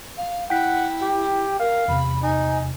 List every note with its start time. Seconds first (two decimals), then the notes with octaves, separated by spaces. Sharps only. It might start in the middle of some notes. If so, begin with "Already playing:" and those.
0.18 F5
0.50 E4 F#5 G5 B6
1.02 G4
1.60 A#4 F5
1.88 E2 C3 B5
2.23 D#4 G#5